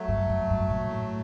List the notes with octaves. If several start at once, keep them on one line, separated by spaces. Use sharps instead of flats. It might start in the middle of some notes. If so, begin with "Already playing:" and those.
Already playing: F#3 A3
G2
F#2
G2
A#2
A2